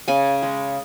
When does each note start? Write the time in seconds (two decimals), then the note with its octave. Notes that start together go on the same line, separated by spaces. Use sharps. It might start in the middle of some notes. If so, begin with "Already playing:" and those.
0.08 C#3 G#5
0.42 G#3